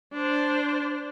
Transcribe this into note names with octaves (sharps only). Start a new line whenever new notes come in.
D4 C5